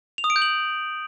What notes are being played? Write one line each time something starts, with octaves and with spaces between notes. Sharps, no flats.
F7
D#6
D7
G6
F#7